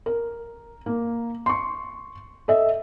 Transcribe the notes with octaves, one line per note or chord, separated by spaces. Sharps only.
A#4
A#3
C6 C#6
A4 D#5 E5